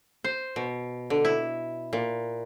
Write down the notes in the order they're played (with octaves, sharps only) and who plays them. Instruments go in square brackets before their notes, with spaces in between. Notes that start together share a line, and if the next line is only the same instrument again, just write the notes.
[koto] C5
B2
D3
E4
A#2